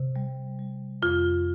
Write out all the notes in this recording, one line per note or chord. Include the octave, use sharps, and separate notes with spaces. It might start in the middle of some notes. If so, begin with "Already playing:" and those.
Already playing: C3
G3
G3
F2 F4